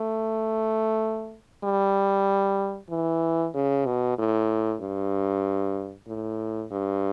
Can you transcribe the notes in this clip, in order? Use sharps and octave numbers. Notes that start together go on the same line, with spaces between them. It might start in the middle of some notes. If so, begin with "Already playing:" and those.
Already playing: A3
G3
E3
C#3
B2
A2
G2
A2
G2